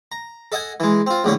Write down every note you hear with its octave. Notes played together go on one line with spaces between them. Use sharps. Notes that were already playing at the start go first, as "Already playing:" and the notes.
A#5
A4 D#5 F#5 G#5
E3 G#3
C4 F4
A#1 A2 D3 C#5